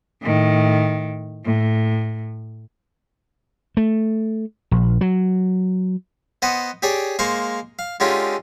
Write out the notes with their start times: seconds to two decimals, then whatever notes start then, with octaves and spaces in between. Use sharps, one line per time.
0.22 A2 D#3
1.45 A2
3.77 A3
4.71 A#1
5.01 F#3
6.42 B3 C5 D#5 F#5
6.82 G4 G#4 C#5 D5
7.19 G#3 A#3 C5 F5 A#5 C#6
7.79 F5
8.00 D3 G#3 C#4 D#4 F4 G4